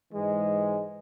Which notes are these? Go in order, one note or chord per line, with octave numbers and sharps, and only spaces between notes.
G#2 E3 G#3